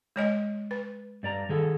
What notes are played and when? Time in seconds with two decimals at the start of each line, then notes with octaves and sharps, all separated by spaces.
0.16 G#3 C#5 D#5
0.71 B4
1.23 G2 D5 A#5
1.49 D#3 G#4 A4